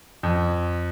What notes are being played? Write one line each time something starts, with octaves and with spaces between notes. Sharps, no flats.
F2